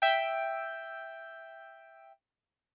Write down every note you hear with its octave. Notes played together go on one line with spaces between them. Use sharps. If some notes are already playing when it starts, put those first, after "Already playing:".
E5 G5